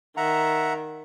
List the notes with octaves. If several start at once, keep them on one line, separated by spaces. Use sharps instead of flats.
D#3 E5 F#5 A#5